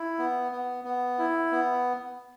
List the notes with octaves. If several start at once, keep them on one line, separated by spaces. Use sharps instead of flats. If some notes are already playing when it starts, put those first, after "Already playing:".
Already playing: E4
B3
B3
B3
E4
B3